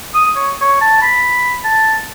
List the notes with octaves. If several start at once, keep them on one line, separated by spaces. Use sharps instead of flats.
D#6
C#5
C#5
A5
B5
A5